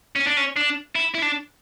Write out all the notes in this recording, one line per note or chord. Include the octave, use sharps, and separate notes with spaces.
C#4
D4
C#4
D4
E4
E4
D4